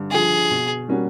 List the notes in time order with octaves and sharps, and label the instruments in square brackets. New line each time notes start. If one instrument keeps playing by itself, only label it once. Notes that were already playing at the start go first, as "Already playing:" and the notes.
Already playing: [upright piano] G2 D3
[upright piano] D3 F3 [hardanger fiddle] G#4
[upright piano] B2
G3 A#3 C#4 F#4